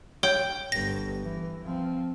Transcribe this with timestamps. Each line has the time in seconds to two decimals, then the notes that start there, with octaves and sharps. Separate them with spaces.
0.23 C#5 G5
0.72 G1 B3 A#6
1.23 E3
1.64 F3 C4